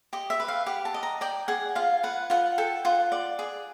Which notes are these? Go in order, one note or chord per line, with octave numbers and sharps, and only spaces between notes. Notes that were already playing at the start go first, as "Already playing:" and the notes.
G4 D#5
E5
B4
F5
G4 F#5
A5
D#5
A#5
D5 G5
G#4 F#5
F4 F5
B4 F#5
F4 F#5
A4 G5
F4 F#5
D5
G#4